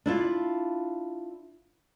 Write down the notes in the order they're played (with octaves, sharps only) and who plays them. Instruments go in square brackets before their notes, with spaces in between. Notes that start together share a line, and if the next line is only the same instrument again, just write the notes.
[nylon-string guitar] D4 E4 F4